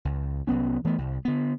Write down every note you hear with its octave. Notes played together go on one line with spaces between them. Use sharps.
C#2
C2 F#3 B3 C#4
E3 A3 B3
C2
D3 B3